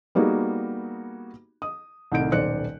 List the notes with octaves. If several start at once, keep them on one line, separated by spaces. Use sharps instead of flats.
G3 A#3 B3 D#4 F#4 G#4
D#6
C2 A2 D#3 G6 D7
D#1 B1 C5 D5 F#6 C#7